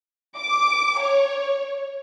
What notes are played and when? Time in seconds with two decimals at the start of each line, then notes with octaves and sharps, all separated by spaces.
0.37 D6
1.00 C#5